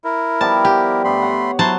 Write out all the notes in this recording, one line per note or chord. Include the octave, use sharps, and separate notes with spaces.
E4 A#4
F3 G3 B3 A5
G4
G2 A3 B5 C6
C#5 F#5
F#3 E4 C5 A5